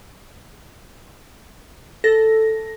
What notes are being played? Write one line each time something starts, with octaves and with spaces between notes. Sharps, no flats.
A4 A#6